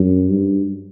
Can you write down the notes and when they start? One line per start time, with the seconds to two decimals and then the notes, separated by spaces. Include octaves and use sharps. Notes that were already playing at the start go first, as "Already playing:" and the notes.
Already playing: F#2
0.30 G2